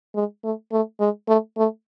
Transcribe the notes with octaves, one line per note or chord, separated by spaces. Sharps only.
G#3
A3
A3
G#3
A3
A3